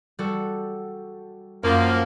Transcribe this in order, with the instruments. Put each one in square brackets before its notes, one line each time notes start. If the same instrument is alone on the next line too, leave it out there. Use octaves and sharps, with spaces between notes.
[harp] G3 F#4 A4
[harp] F#2 [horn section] F3 A#3